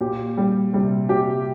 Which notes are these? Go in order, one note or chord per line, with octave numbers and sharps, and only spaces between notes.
A#2 G4
G3
C3 G3
C3 G4